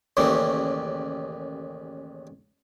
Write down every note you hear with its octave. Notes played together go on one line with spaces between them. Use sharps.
A1 D#2 C#3 E3 G3